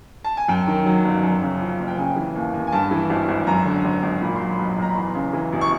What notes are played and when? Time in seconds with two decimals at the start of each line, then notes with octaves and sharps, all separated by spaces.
0.24 A5
0.37 G#5
0.48 F#2 G5
0.67 D#3
0.86 F#3
1.04 G1
1.23 F#2
1.42 C#3
1.61 F3
1.79 F#1
1.88 G5
1.98 C#3 G#5
2.16 E3
2.36 D#2
2.53 D#2
2.67 G#5
2.72 G2 A5
2.91 E3
3.10 G#1
3.28 G#1
3.47 F#2 A#5
3.65 D3
3.84 G#1
4.03 G#1
4.21 A#2 B5
4.35 F#3 C6
4.49 B5
4.59 B1
4.78 B1 A#5
4.88 B5
4.96 E2 C6
5.15 C#3
5.33 E3
5.52 E1
5.61 C#6